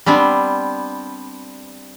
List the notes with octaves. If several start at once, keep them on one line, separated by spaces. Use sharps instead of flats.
G3 B3 C4 D4